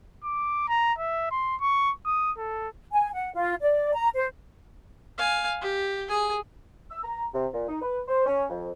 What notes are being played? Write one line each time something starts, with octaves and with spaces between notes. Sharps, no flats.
D6
A#5
E5
C6
C#6
D#6
A4
G#5
F#5
F4
D5
A#5
C5
F5 G#5
G4
G#4 G#5
E6
A#5
C3
A#2
D#4
B4
C5
C#4
F2